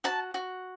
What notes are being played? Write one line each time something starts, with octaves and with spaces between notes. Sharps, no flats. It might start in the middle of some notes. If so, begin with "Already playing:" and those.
F#4 A5
F#4